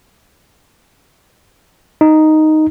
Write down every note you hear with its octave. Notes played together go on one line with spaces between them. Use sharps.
D#4